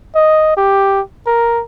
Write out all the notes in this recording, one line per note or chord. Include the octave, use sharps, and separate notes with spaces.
D#5
G4
A#4